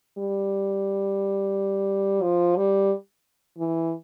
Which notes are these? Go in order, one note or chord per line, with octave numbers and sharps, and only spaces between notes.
G3
F3
G3
E3